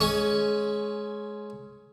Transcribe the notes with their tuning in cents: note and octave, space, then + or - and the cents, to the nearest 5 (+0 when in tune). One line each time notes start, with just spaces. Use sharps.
G#3 +15 C#4 +0 C#6 +0